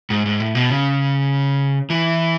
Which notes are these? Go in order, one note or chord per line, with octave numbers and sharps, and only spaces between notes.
G#2
G#2
A2
B2
C#3
E3